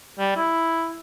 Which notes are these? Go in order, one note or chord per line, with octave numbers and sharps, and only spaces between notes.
G3
E4